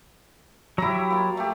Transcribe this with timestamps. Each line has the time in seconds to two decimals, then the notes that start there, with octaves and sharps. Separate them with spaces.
0.78 F#3 E4 G4 E5 A#5
1.11 A#3 F4
1.37 A3 G4